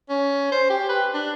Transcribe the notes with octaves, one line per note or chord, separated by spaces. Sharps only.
C#4
C5
G4
B4
D4